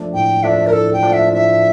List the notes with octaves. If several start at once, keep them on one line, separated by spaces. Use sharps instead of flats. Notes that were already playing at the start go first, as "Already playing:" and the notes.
Already playing: F3 A3 D4
A2 G5
F3 A3 D4 E5
A#4
A2 A4
G5
F3 A3 D4
E5
A2 E5